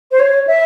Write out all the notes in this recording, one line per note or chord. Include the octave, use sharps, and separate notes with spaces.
C5
C#5
E5